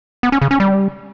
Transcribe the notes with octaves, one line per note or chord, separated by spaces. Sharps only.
B3
C#4
C#3
C#4
G3